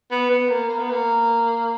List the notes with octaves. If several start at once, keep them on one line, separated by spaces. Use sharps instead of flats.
B3
B3
A#3
A#3
B3
A#3